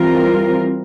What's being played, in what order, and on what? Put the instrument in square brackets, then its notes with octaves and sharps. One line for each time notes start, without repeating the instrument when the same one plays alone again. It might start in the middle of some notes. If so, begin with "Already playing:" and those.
Already playing: [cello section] E3 G3 C4 F4 A#4